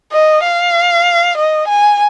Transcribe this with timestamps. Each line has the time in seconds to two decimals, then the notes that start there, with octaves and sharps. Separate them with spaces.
0.12 D#5
0.43 F5
1.38 D#5
1.68 G#5